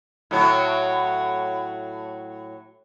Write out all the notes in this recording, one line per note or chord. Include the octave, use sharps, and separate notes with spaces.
A2 F#3